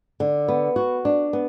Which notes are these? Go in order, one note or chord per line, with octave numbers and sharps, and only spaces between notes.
D3
B3
F#4
D4
B3